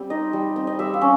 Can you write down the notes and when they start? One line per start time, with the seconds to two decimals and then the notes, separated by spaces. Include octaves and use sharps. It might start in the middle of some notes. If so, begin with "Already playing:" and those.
Already playing: G3 C4
0.10 D#4 D#5
0.33 G3
0.56 C4
0.67 D#5
0.79 G3 E5
0.94 F5
1.01 C#4